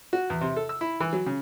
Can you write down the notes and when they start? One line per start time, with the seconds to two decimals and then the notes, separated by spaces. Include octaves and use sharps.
0.13 F#4
0.30 E2
0.41 C3
0.56 A4
0.69 E6
0.81 E4
1.00 E3
1.13 F#3
1.26 C#3